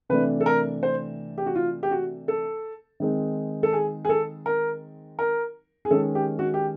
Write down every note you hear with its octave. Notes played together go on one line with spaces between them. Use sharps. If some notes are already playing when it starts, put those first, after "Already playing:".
C3 E3 A3 D4 B4
A4
A#4
C5
G4
F#4
F4
G4
F#4
A4
D#3 G#3 C4 D#4
A4
G#4
G#4
A4
A#4
A#4
G#4
D#3 G#3 C#4 A4
G4
F#4
G4